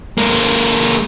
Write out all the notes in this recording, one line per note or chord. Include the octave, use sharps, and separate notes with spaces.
G#3 A#3